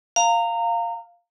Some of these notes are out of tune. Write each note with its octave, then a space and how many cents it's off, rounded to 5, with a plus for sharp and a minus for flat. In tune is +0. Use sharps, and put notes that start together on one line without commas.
F5 +0 A#5 -25